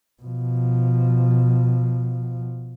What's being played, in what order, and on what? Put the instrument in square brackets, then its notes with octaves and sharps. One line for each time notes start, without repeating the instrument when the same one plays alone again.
[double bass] B2 F3